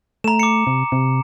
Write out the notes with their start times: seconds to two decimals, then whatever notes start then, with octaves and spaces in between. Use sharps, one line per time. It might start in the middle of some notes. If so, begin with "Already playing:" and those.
0.24 A3 A#5 E7
0.40 D6 C#7
0.67 C3
0.92 C3